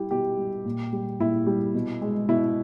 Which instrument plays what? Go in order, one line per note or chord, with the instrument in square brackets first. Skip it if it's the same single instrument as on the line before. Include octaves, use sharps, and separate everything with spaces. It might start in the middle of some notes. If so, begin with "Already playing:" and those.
Already playing: [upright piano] G3 E4 G4
B2 G4
G3
A#2
G3
A#2 E4
G3
B2
G#3
B2 E4